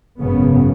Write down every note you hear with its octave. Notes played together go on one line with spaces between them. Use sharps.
G#1 F#2 C#3 B3